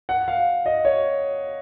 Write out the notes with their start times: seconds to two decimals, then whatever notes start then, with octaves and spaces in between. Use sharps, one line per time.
0.09 F#5
0.28 F5
0.66 D#5
0.85 C#5